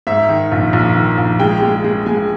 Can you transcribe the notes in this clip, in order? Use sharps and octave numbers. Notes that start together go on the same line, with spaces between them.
G#2 E5
D#3
A#1
A#1
D#3
A#1
G#3 G5
G#3
G#3
G#3 G#5